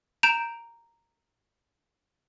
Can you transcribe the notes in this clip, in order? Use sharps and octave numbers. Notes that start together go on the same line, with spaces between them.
A#5 G6 D7 E7 F7